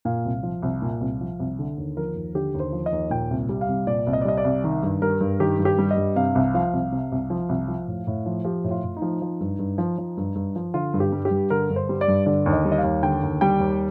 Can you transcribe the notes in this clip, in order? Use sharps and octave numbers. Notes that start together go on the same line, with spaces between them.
A#2 F5
C2
F3
C2
A#2
C2
F3
C2
D3
D#2
F3 A#4
D#2
D3 G4
D#2
C5
F3
D#5
D#2
A#2 G5
C2
G3
F5
C2
A#2 D5
C2
D#5
D5
G3 D#5
D5
C2
D#3
G2
G3 A#4
G2
D#3 G4
G2
G4
G3
D#5
G2
C3 F5
C2
F3 F5
C2
C3
C2
F3
C2
F3
A2
A2
F3
F3 G4
A2
F4
A2
D#4
F3
F3
G2
G2
F3
F3
G2
G2
F3
D3 F4
G2
G4
G3
G4
G2
D3 A#4
G2
C5
G3
D5
G2
D3 D5
D#2
D#5
G3
D#5
F5
D#2
D3 G5
D#2
G3 G5
D#2